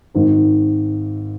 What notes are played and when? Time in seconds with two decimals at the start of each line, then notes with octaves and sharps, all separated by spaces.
0.14 G#1 G#2 D#3